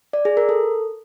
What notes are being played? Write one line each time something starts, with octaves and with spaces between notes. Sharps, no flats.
D5
G#4
A#4
A4